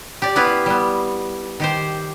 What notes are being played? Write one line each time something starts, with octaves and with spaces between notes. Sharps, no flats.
G4 D5
B3 E4 F4 G4 B4
G3 B3
D#3 G4 C5